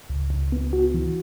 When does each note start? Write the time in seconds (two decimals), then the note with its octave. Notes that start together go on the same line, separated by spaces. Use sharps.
0.10 C#2
0.30 C#2
0.52 B3
0.73 F#4
0.94 E3